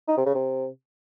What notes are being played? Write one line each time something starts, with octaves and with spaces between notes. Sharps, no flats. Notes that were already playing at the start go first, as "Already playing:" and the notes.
D#4
C3
C#3
C3